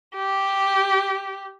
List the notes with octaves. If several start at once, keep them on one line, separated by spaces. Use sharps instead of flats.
G4